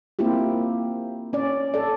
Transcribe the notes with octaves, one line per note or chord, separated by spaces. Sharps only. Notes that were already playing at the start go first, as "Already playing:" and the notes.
A#3 C4 E4 F4 G4
C#4 D5
A4 D5